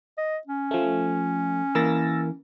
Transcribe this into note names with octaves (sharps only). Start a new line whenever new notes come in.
D#5
C#4
F3 A3
E3 A#3 A#4 E6 A6 A#6